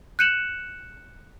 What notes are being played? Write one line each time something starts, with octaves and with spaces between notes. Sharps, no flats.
F#6 G6 C#7 D#7 E7 F#7